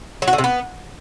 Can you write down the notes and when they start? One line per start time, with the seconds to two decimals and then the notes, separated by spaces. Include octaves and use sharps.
0.22 F#3
0.27 F#4
0.33 D3
0.38 C3
0.44 B3